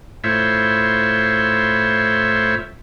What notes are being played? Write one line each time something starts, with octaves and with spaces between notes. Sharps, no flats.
A2 E4 F4 C5 C#5 E5